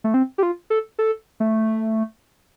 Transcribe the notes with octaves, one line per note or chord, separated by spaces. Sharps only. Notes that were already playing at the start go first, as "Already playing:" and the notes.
A3
C4
G4
F4
A4
A4
A3